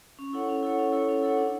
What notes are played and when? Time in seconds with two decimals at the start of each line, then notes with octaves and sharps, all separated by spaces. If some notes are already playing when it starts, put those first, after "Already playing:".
0.19 C#4
0.33 E4 A4 C#5 F#5
0.49 C#4
0.63 E4 A4 C#5 F#5
0.79 C#4
0.92 E4 A4 C#5 F#5
1.08 C#4
1.22 E4 A4 C#5 F#5
1.37 D4